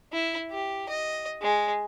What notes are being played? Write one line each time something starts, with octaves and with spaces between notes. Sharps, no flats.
E4
G4
D#5
G#3